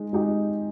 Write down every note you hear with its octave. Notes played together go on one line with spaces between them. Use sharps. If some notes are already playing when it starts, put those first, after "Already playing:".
Already playing: G#3 D#4
G#3 D#4 G4